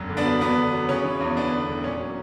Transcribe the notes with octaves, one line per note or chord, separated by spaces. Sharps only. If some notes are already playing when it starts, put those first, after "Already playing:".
Already playing: E1 F#2
D3
B3 D4
F#3
E2 B3
D3
F#3
C#3 C#4
E3
E2
E2 B3 D4
D3
E1
A#2 C#4
F#3